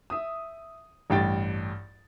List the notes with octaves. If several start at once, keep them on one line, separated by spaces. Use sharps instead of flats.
E5 D#6
A1 G2 G5 A6